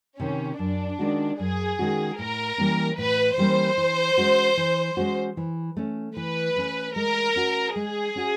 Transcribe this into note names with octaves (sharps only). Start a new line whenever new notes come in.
C3 D#3 C#4
F#2 D4
D#3 G#3 C#4 F#4
F#2 G#4
D#3 G#3 C#4 F#4
A2 A#4
E3 G3 A#3 C#4
A2 B4
E3 G3 A#3 C#4 C5
E3
G#3 C#4 F#4
E3
G#3 C#4 F#4
E3
A3 C#4
E3 B4
A3 C#4
G#3 A#4
C#4 F#4
G#3 G#4
C#4 F#4